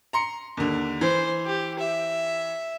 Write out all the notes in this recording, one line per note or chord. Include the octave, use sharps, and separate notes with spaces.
A#5 C6 C#7
D#2 D3
E3 C5
G4
E5